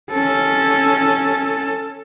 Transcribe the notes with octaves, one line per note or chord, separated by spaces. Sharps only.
C#4 A4